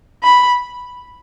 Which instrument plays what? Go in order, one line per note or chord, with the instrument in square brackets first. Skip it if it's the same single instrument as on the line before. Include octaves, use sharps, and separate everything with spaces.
[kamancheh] B5